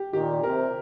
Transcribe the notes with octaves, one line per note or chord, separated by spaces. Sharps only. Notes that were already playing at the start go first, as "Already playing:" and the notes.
Already playing: G4
A#2 D#3 G4
C3 A#4